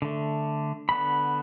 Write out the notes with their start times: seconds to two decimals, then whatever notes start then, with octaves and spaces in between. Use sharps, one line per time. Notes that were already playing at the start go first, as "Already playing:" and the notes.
0.02 D3 A3
0.89 D3 B3 B5